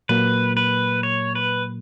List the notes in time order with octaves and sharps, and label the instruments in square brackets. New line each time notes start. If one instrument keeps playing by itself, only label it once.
[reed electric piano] A#2 F#3 A#3 [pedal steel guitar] B4
[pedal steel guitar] B4
C#5
B4